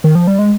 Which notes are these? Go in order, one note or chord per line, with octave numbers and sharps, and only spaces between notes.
D#3
F3
G3
G#3